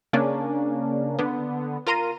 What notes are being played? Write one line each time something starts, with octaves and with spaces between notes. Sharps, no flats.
C#3 A#3 C#4 D4
D3 B3
F4 A#4 A#5 C6 D#7